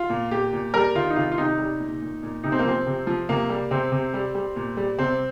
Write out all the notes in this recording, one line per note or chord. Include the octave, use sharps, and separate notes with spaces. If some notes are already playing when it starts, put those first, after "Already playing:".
Already playing: F4
A#2
A#2 G4
A#2
G3 A#4
D#3 F4
D#4
C3 F4
F4
C3 D#4
G3
A#2
A#2
A#2
C3 D#4
C4
A#3
F3 C4
C3
F3
C3 A#3
G3
C3 C4
C3
G3
G3
A#2
G3
C3 C4